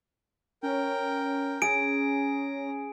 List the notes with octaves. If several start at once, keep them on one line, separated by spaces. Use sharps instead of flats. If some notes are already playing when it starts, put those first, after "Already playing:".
C#4 A#4 G5
G#4 A#5 D7